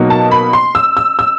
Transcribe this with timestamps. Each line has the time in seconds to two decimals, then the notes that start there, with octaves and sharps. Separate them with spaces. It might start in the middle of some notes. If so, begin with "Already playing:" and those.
Already playing: B2 F#3 A#3 D#4
0.10 A5
0.31 B5
0.53 C6
0.75 E6
0.97 E6
1.19 E6